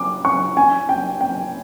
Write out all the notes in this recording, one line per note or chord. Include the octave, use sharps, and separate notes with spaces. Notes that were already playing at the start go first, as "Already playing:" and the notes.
Already playing: D6
C#6
G#5
G5
G5